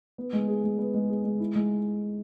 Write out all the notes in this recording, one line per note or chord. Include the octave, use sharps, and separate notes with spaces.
B3
G#3
G#4
G#3
B3
G#3
G#4
G#3
E4
G#3